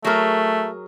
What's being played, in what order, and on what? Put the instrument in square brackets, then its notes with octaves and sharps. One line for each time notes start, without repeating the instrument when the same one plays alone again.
[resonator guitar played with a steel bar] F#3 G#4 A#4 [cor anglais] A3